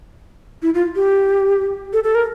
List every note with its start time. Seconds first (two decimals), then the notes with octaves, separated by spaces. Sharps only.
0.62 E4
0.74 F4
0.96 G4
1.93 A4
2.04 A4
2.15 A#4